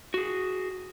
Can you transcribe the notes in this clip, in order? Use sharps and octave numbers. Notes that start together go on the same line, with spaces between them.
F#4 G#4